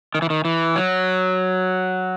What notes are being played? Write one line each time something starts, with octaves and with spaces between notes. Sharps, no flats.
D#3
E3
D#3
E3
F#3